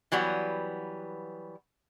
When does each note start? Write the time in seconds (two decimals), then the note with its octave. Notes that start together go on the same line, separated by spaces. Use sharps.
0.12 E3 F#3 G3 B3